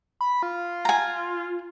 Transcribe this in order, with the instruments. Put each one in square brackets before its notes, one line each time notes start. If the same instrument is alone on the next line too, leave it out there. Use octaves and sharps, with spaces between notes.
[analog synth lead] B5
F4
[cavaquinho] G#5 A#5